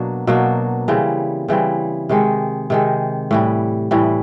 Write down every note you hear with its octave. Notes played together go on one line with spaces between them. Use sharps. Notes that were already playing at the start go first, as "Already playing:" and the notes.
Already playing: B2 F#3 A#3 D4
B2 F#3 A#3 D4
C#3 E3 G3 C4
C#3 E3 G3 C4
C3 D#3 G#3
C3 D#3 G#3
A2 E3 G3
A2 E3 G3